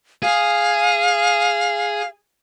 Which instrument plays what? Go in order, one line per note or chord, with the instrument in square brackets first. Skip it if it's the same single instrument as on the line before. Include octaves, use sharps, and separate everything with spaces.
[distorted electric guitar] G#4 [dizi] F5